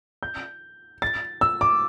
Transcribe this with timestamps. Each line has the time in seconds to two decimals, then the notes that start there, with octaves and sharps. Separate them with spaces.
0.23 G6
1.02 A6
1.41 E6
1.61 D6